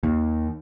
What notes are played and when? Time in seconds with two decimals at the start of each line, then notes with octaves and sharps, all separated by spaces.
0.03 D#2